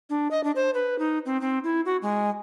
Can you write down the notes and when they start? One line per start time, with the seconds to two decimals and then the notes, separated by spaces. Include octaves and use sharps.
0.10 D4
0.31 D#5
0.44 D4
0.56 C5
0.74 B4
0.99 D#4
1.26 C4
1.41 C4
1.64 E4
1.85 F#4
2.02 G#3